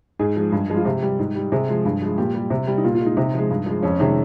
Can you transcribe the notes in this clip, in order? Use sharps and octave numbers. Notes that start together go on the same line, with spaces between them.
G#2 G#4
F3 G#3
G2
F3 G#3
F4
C3 G4
G3
G#2
G3
C3 G#4
F3 G#3
G2
F3 G#3
A#2 G4
G3
C3
G3
D#4
A#2 F4
F4
G#3
D#4
C3 D#4
F3 G#3
G2
F3 G#3
F2 C#4
C3 D#3 G#3